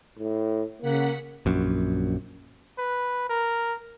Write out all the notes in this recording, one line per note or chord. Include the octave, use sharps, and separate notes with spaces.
A2
C#3 A#3 F#5 B6
A#1 F#2
B4
A#4